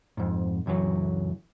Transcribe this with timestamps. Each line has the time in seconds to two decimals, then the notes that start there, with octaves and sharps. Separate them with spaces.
0.17 F2 G#2
0.66 C#2 F#2 E3 F#3